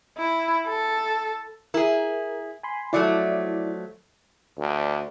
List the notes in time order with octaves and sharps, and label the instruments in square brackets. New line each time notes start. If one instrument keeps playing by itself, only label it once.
[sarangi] E4
A4
[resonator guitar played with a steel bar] E4 G#4 [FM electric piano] A#4
[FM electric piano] G#5 B5 C6
[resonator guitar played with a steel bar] F3 F#3 A3 [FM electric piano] E4 D5
[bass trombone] D2